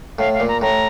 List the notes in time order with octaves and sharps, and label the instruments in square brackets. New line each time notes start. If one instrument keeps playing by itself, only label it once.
[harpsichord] A2 [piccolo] F5
[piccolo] F5
[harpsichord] A#2
[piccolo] A#5
[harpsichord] A2 [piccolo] A#5